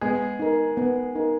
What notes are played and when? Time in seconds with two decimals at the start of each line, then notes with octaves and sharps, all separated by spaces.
0.01 G#3 B3 G#4
0.39 D#4 A#4
0.77 B3
1.15 D#4 A#4